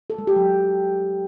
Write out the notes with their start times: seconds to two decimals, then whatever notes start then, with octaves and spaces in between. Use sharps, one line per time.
0.10 A4
0.18 G#3
0.27 G4
0.36 F#3